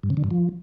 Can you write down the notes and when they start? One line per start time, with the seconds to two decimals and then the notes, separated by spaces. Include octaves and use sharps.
0.03 G2
0.10 C#3
0.17 D3
0.24 G2
0.31 F3